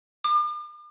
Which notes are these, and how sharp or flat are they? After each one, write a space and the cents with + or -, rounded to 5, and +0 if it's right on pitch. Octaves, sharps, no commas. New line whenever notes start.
D6 +40